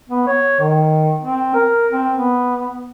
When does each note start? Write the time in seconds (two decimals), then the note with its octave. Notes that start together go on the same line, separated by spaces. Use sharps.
0.10 B3
0.27 C#5
0.60 D#3
1.23 C4
1.54 A#4
1.93 C4
2.16 B3